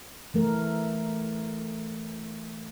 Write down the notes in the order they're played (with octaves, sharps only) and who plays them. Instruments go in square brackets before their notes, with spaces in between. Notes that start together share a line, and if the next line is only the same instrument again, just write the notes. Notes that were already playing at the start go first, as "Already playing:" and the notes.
[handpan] E3 A3 A#4